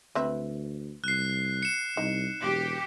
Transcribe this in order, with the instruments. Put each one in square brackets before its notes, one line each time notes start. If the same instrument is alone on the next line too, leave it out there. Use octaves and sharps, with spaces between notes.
[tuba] D2 [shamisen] C4 B4 E5
[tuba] C2 [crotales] F#6 C7
[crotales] C#7 E7
[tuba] C2 [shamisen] D#4
[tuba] E1 [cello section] G4